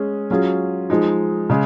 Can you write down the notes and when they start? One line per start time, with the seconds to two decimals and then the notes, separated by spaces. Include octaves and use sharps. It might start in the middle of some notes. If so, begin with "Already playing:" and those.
Already playing: G#3 C#4 G#4
0.31 F#3 C#4 F4 G#4
0.90 F3 G#3 D#4
1.50 C#3 G#3